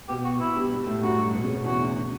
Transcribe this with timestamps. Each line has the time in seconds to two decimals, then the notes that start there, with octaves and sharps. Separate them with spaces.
0.08 B2 B3 G4
0.24 F#4
0.39 B2 B3 E4
0.56 G2 G3
0.71 G2 G3
0.87 A2 A3
1.02 F#2 F#3 F#4
1.18 G2 G3
1.34 B2 B3
1.43 C#3 C#4
1.54 B2 B3
1.64 E2 E3 F#4
1.80 D2 D3
1.96 D3